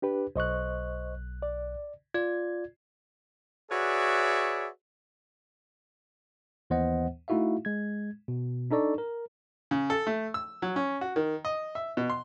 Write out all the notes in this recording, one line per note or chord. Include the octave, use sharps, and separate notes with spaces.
D4 G4 B4
B1 C5 D#5 C#6 F#6
D5
F4 D5 G#6
F#4 G#4 B4 C#5 D5 E5
D#2 E3 B3 C5 D#5 F#5
A3 D#4 E4 F#4 E5 F5
G#3 G#6
B2
D4 D#4 A4 D5 C#6
A#4
C#3
A4
A3
E6
F#3
C#4
F#4
D#3
D#5
E5
B2
C6